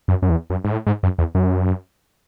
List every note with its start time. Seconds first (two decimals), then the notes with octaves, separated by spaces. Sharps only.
0.08 F#2
0.22 F#2
0.30 E2
0.50 F#2
0.64 G#2
0.72 A2
0.87 G#2
1.03 F#2
1.19 E2
1.35 F#2